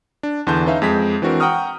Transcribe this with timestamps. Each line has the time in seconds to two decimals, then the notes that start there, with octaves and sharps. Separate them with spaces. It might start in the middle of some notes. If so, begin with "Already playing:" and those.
0.23 D4
0.47 E2 D3 E3 A5 C6 G6
0.66 C#4 D#4 B4 E5 F5
0.82 F2 G#3 G#4 B6
1.22 E3 C4 D4 F#4 A#4 C5
1.40 F#5 G5 A#5 C#6 D#6 F6